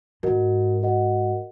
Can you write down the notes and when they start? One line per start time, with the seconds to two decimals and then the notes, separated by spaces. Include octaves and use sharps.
0.23 G#2 F#4 A#4 D#5 F#5
0.83 F#4 A#4 D#5 F#5